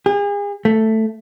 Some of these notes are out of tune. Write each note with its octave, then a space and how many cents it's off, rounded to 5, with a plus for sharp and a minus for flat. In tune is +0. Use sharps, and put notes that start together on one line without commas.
G#4 -40
A3 +5